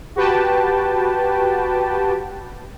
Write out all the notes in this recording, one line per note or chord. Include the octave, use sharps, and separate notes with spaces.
F#4 G4 B4 G5 A5